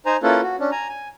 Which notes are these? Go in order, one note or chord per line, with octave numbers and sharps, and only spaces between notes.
D#4 C5 G#5 A#5
A#3 C#4 E4 F4 A4 B4
F#4
C#4 D4
G#5 A#5
G#5